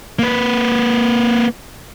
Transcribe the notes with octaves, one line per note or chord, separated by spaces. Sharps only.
A#3 B4